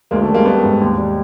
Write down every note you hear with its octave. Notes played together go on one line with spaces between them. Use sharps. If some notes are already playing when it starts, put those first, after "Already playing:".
D2 G#3 A#3
A3
G3
G#3 A#3
G3 A3 B3
G#2
D#2
G3